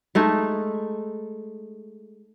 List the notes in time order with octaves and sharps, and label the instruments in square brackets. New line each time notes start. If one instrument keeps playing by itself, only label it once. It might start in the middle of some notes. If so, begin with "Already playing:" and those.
[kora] G#3 A3 D#4